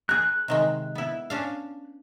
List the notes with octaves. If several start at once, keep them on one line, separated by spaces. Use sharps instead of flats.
G#4 A#4 F#6
C3 D#3 G#3
B3 E4
C#4 D4 F5